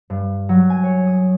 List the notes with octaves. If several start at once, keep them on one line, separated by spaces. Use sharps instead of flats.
G2
F#3
G#5
C#5
D#6